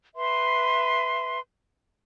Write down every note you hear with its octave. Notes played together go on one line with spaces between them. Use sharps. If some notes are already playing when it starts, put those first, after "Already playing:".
B4 E5 C6